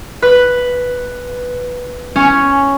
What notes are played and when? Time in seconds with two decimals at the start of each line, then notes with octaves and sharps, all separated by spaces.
0.22 B4
2.16 C#4